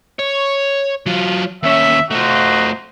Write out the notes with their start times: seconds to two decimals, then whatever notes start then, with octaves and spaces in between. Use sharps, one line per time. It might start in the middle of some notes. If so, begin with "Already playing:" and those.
0.19 C#5
1.06 F#3 F4
1.63 D#2 C#4 E5
2.11 A3 D#4 F4 F#4 C5